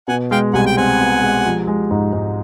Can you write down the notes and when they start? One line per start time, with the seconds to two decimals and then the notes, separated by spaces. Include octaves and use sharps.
0.08 B2 F#5 G#5
0.31 G#3 F5 G5
0.53 C2 F#5 G#5
0.66 G5
0.77 C4 F#5 G#5
1.00 B2
1.22 G#3
1.45 F3
1.67 G#3
1.91 G#2
2.13 G#2